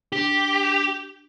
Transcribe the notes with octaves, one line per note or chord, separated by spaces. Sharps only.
D4 G4